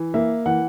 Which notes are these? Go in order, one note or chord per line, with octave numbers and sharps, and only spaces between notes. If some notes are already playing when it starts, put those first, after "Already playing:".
Already playing: E3
A#3 E5
E3 F#5